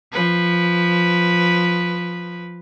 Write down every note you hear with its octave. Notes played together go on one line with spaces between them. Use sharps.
F3 B4